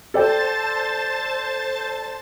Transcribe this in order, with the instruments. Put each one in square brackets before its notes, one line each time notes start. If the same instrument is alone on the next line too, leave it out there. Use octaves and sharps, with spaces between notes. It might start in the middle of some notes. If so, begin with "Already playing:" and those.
[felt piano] A4 D5 G5 [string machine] C5 A5 A6